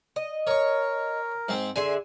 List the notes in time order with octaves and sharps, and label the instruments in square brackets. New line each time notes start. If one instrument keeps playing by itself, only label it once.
[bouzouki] D#5
[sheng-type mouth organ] A#4 [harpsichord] C#5 C#6
[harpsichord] G#2 C4
[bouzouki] D3 G#4 E5 [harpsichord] G#5 C6